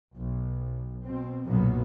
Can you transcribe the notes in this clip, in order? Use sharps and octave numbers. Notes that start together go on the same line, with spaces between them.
B1
B2 C4
B1 F#2 A#2 F#3 A#3 B3